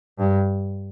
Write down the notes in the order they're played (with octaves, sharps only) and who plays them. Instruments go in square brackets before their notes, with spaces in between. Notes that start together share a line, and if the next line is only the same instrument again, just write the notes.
[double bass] G2